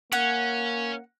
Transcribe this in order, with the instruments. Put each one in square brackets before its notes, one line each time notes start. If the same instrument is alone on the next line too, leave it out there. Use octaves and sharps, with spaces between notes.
[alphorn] A#3 [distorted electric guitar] C#4 [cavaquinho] F#5